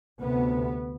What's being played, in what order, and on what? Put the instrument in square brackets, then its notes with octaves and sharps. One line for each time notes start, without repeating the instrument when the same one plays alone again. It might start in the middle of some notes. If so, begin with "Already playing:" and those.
[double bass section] D2 C3 B3